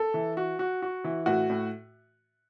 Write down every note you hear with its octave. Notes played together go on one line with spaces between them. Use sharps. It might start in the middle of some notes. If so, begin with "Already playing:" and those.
Already playing: A4
E3
F#4
F#4
F#4
E3
A2 F#4
A2